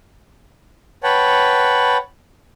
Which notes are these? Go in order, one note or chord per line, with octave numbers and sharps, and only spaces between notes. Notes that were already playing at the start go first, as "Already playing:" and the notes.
B4 C#5 F#5 G5 A5 B5